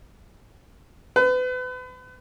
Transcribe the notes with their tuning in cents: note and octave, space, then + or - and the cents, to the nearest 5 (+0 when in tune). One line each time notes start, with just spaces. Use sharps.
B4 +35